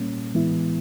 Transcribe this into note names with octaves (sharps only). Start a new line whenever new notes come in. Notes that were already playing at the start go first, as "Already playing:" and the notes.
Already playing: A#2 G3 A#3 C#4
A2 E3 G#3 B3 E4